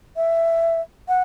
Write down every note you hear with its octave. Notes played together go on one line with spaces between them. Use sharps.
E5
F#5